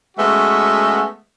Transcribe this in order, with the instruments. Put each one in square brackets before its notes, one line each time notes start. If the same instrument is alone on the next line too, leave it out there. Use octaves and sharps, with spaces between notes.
[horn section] G#3 A3 B3 C#4 F#4